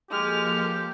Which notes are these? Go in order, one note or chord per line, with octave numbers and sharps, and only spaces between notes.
F3 G#3 A#3 G4 A4 F6